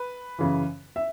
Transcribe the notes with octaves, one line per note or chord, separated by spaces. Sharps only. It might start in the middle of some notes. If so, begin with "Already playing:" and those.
Already playing: B4
F#2 C#3 E3
E5